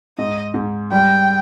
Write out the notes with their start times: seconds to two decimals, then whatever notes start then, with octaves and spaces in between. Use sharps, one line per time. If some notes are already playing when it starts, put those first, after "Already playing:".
0.18 G#2 D#5
0.54 G#2
0.92 G3 G5